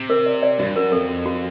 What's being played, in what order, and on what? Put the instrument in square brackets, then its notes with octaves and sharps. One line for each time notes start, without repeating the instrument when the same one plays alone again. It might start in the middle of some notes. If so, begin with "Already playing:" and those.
Already playing: [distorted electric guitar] C3
[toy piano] A#4
D5
D5
[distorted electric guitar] G2 [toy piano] F#4
[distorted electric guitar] F#2 [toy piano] A#4
[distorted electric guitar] F2 [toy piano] A4
[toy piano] F#4
F#4